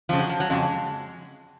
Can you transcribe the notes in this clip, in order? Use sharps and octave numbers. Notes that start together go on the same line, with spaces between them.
F2 C#3 F3
F#3
F3
F#3
F2 C#3 G#3